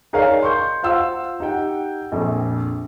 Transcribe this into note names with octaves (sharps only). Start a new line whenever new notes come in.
D#4 G#4 A#4 C#5 D5 F5
C6 C#6 G6
F4 C5 F5 F#5 C6 E6
D#4 G4 F#5 G5
A#1 F2